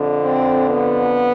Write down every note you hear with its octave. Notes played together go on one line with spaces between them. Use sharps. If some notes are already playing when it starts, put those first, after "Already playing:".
Already playing: F2 D3
C4
B3